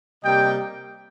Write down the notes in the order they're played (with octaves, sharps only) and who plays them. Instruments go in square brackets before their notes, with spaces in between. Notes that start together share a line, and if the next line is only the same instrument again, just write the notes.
[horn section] C3 G3 A#3 D#5 G5